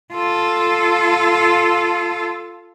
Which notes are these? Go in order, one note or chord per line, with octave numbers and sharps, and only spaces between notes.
F4 A4